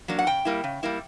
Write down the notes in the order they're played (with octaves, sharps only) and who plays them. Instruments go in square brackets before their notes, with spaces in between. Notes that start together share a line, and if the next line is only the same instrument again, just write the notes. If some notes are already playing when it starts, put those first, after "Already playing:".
[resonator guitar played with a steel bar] F#3 A#3 D4
F#5
C#3 G5
G3 A#3 E4
C#3
G3 A#3 E4